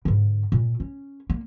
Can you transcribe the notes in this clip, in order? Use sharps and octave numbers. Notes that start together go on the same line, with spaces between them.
G#2 D3
A#2
C#4
A#3